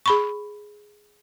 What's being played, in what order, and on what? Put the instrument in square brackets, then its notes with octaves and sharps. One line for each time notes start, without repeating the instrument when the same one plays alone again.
[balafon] G#4 B5 C#6